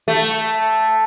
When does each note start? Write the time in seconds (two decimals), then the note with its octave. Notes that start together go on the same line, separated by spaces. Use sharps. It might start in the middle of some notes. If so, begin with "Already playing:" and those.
0.08 A3